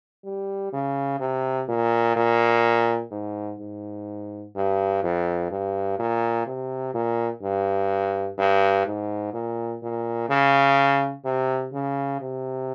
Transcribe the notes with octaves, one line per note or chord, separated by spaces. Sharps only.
G3
C#3
C3
A#2
A#2
G#2
G#2
G2
F2
G2
A#2
C3
A#2
G2
G2
G#2
A#2
A#2
C#3
C3
C#3
C3